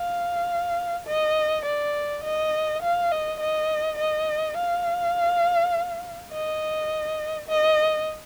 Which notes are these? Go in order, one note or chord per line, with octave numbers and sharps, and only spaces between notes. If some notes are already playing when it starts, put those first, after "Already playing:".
Already playing: F5
D#5
D5
D#5
F5
D#5
D#5
D#5
F5
D#5
D#5